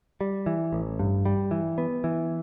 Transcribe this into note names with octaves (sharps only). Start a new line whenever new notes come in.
G3
E3
A1
G2
G3
E3
B3
E3